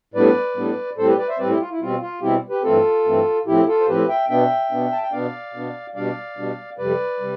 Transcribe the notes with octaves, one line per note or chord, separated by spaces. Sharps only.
A2 G3 B3 D4 B4 D5
A2 G3 B3 D4
A2 G3 C4 A4 C5
G4 B4
B4 D5
C5 E5
A2 G3 C4 B4 D5
E4 G4
F4
E4
B2 G3 C4 F4
F4
B2 G3 C4 E4 G4
G4 B4
G2 E3 A3 C4 F4 A4
G2 E3 A3 C4
A2 F3 C4 E4 G4
F4 A4
C5
A2 F3 C4 G4 B4
E5 G5
B2 B3 D4 E5 G5
B2 B3 D4
A5
G5
B2 B3 D4 D5 F5
B2 B3 D4
B2 G3 D4 D5 F5
B2 G3 D4
F2 C3 G3 B4 D5
C3 G3